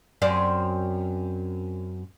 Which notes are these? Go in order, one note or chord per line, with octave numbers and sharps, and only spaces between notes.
F#2 C4 D5